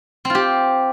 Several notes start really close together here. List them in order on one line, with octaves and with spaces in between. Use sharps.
C4 F4 G4